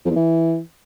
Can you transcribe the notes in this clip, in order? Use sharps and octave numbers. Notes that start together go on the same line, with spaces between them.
F2
E2
E3